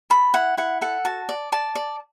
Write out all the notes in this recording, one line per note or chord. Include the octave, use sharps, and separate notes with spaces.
A4 B5
E4 F#5
E4 F#5
A4 F#5
F#4 A5
D5
D5 A5
D5